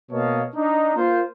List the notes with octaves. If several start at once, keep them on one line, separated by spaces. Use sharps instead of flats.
B2 A#3 C#5 D#5 F5 A5
D4 D#4
A#3 F4 C5